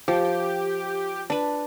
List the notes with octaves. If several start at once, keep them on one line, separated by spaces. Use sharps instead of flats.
F3 G4
D4 B4